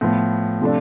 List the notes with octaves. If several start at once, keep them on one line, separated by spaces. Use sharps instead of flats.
A2 F3 B3
C3 F3 A3 D4